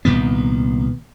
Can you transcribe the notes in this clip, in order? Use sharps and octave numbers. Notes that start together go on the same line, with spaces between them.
C2 A#2 D#3 B3